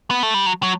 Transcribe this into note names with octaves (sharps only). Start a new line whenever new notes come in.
B3
A3
G3
F#3
F#3